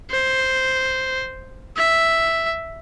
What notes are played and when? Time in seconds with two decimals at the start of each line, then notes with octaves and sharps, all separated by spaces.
0.10 C5
1.77 E5